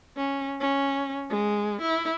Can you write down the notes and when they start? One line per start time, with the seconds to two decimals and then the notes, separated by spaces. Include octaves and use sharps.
0.17 C#4
0.60 C#4
1.30 G#3
1.81 E4